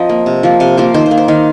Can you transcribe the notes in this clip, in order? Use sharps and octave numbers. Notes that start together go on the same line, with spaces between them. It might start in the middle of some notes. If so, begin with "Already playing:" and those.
Already playing: F3 C4 A#4 C5 D#5
A#3
C3
F3 A#3
C3 F5
F3 A#3 C5
D#3 C5
C5
A#3
C5
D#3 F5